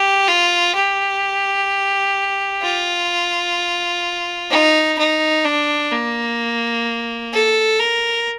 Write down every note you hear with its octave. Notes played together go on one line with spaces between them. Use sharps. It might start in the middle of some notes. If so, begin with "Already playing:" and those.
Already playing: G4
F4
G4
F4
D#4
D#4
D4
A#3
A4
A#4